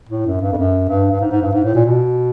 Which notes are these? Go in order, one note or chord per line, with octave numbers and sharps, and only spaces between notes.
A2
F#2
G2
F2
F#2
G2
G2
G#2
G#2
G2
G#2
A2
A#2
B2